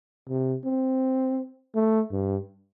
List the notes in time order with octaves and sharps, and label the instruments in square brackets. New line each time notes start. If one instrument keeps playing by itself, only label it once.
[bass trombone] C3
C4
A3
G2